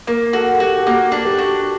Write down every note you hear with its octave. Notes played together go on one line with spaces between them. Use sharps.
A#3 A#4
F#4 A4
F#4 G4
A4
A#3 G4
D4
G4
F#4